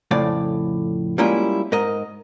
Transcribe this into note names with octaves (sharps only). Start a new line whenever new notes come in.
F2 A2 C#3 D5
G3 G#3 A#3 C#4 E4 F4
G#2 A#4 D#5